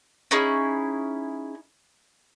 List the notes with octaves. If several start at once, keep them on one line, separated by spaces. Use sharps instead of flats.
C#4 D#4 E4 G#4